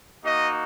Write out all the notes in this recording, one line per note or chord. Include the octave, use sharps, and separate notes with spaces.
A#3 D#4 F#4 D#5